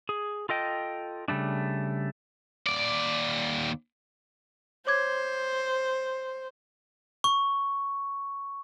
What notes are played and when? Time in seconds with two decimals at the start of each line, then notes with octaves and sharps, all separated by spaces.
0.09 G#4
0.49 F4 A4 D#5 G5
1.28 C#3 G3 A3 D4
2.66 D#2 D5
4.87 C5 C#5 D6 G#6
7.24 C#6